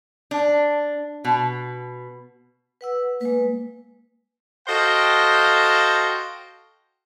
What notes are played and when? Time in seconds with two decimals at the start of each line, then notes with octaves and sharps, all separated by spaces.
0.31 D4
1.25 B2
2.81 B4 F#5 E6
3.21 G#3 A#3 B4
4.68 F#4 A4 C5 D#5 F5 G5